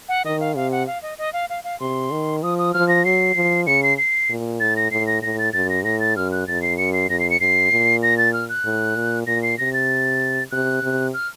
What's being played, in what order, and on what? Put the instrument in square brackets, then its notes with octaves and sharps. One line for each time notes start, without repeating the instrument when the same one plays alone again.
[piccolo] F#5
[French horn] D#3 [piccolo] D#5
[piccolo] F5
[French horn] C3 [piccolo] F5
[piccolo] F#5
F5
D#5
D#5
F5
F5
F5
[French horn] C3 [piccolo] C6
[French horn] D#3
[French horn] F3 [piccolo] D#6
[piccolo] D#6
[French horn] F3 [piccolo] F6
[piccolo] A#6
[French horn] F#3 [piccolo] C7
[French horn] F3
[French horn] C#3 [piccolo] C#7
[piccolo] C7
C7
[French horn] A#2
[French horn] A2 [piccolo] A6
[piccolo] A#6
[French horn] A2 [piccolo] C7
[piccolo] A#6
[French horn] A2 [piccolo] A#6
[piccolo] A6
[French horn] F#2 [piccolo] A6
[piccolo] A#6
[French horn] A2 [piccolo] A#6
[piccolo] A6
[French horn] F#2 [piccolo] F6
[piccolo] F#6
[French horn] F2 [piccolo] A6
[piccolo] C7
[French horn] F#2 [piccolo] C#7
[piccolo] C7
[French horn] F2 [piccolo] A#6
[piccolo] C7
C#7
[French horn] F#2 [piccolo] C7
[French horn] A#2
[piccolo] A#6
A6
F6
F#6
[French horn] A2
A#2
[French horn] A#2 [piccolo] A#6
[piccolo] C7
[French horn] C3 [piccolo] A#6
[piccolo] A6
[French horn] C3 [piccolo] F#6
[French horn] C3
[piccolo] F6